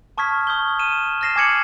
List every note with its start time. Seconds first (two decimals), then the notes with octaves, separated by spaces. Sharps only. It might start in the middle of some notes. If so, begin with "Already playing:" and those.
0.18 A5 C#6 D#6 F6 G#6 B6
0.47 C#6 D#6 G6 G7
0.79 F6 D#7 E7
1.21 F6 A6 A#6 C7 E7
1.36 G#5 D6 G#6 C#7 F#7